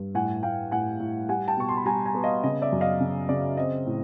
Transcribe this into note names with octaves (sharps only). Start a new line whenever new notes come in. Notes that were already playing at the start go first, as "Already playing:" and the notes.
Already playing: G2
A2 F#5 G#5
A2 F5 G5
A2 F#5 G#5
A2
G3 F#5 G#5
G5 A5
B2 C#6
C6
B5
G3 G#5 A#5
G#5 A#5
B3
D#5 F5
C#3 D#5
D5 E5
F#2
D#5 F5
C#3
C#3 D5
C4 D#5
A2